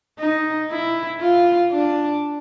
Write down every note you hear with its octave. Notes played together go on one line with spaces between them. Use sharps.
D#4
E4
F4
D4